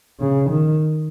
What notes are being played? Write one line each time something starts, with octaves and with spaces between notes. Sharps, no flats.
C#3
D#3